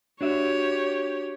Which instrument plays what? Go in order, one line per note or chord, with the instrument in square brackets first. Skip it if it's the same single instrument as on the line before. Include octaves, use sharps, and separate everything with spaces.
[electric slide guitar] D4 F#4 E5 [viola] G4 C#5